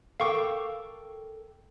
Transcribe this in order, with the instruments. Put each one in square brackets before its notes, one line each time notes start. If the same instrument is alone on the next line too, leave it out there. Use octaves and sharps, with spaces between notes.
[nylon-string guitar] A4 A#4 G5 [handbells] F5 C#6 D6